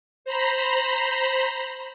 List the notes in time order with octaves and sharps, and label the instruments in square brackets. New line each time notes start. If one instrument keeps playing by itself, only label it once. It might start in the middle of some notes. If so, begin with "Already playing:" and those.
[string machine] C5 A#5 B5